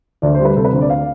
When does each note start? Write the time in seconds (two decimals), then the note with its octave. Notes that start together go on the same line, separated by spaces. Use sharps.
0.22 D2 D5
0.34 C5
0.40 G3
0.45 B4
0.57 C3 A4
0.65 B4
0.73 D2 C5
0.81 D5
0.90 F5